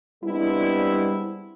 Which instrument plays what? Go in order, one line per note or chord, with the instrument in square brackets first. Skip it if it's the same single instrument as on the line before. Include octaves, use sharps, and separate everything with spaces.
[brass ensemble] G3 G#3 B3 C4 D4 E4